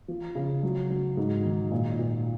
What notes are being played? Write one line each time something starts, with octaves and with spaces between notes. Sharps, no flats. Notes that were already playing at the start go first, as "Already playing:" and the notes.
F3
C#3
F#3
F#3
G#2
D#3
A#2
A#2